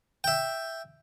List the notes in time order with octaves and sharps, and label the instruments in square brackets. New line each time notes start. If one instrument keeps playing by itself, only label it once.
[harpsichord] E5 G5